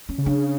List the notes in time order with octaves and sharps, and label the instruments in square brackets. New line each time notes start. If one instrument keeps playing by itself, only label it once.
[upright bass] C#4
[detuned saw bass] C#3
[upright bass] D4